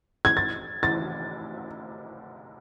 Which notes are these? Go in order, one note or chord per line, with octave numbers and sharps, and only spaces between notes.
G#6
A6
A6